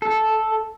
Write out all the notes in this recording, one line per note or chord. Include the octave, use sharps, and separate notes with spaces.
A4